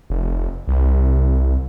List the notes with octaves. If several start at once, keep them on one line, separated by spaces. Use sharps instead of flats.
F1
C2